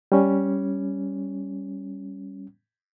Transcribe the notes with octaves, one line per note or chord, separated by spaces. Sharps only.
G3 C#4